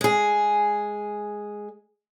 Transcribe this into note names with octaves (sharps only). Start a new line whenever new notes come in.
G#3 G#4